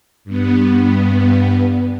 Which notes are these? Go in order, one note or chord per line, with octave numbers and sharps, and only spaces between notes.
G2 B3